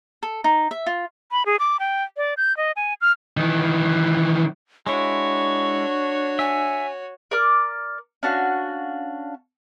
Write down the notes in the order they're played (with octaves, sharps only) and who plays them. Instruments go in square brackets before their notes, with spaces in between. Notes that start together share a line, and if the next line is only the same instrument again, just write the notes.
[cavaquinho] A4
D#4
E5
F4
[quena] B5
G#4
D6
G5
D5
G6
D#5
G#5
F6
[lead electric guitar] D#3 E3
[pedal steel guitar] G#3 E4 [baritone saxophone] D4 [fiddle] F#4 C#5 [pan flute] C#6
[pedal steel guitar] E5 [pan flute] G#5
[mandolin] A#4 D5 D6 F6
C#4 D4 F#4 F5